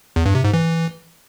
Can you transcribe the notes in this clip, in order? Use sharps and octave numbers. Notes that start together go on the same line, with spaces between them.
E2
G2
C3
G#2
E3